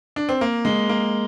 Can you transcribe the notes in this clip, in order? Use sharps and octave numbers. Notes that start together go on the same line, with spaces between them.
D4
C4
A#3
G#3
A#3